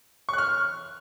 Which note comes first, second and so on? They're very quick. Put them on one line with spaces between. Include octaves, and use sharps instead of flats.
C#6 F#6 F6